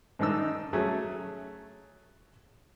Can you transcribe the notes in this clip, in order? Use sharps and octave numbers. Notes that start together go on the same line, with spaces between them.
G#2 D#3 D4 D#4 E6
F#3 A3 C#4 G#4 A4